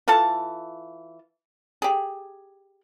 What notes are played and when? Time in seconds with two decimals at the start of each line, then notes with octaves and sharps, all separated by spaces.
0.08 E3 F4 A4 A5
1.82 G4 G#4